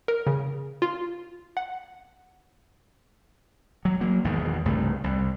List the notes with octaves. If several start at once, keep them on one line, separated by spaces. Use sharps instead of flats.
A#4
C#3
F4
F#5
F#3
F#3 A#3
G#1 E2 G#2 B2
C2 G2 C#3 A3
C2